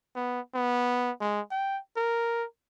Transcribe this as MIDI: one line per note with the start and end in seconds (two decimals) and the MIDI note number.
0.16 0.40 59
0.54 1.11 59
1.20 1.41 56
1.51 1.79 79
1.97 2.45 70